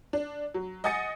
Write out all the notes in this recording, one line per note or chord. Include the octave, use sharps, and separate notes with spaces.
D4
F#3
D#5 F#5 G#5 D#6 A6 C#7